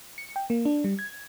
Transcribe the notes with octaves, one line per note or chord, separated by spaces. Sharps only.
C#7
G5
A#3
D4
G3
G#6